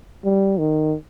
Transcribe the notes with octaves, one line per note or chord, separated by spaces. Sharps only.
G3
D#3